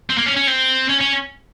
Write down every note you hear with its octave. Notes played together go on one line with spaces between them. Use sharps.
C4
A#3
C#4
C#4
C4
C#4
C#4